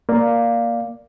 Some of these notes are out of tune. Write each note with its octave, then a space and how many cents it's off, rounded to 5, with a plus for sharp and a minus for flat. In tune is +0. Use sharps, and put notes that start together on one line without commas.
A#3 +0 D5 +0 F5 +0